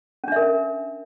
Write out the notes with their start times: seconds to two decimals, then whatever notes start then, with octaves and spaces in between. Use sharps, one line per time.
0.24 C#4
0.28 D4
0.32 E5
0.36 A#4